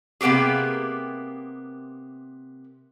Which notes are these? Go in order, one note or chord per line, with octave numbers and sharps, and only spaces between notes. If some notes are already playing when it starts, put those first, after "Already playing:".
C3 A#3 B3 G4 G#4